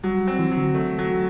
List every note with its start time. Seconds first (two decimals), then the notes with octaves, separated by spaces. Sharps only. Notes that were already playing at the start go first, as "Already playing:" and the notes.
0.04 F#3 G3
0.28 C4
0.39 E3
0.51 F#3
0.57 D3
0.74 A3
0.99 F#3